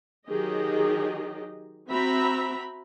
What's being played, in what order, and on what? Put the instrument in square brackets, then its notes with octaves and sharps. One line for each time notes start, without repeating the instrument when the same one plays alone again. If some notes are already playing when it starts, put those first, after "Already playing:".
[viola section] D#3 F#3 G4 G#4 D#5
C4 F#4 E5 A#5 B5